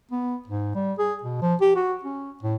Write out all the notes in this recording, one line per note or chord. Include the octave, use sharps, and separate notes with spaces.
B3
G#2
G3
G#4
B2
F3
G4
F#4
C#4
A2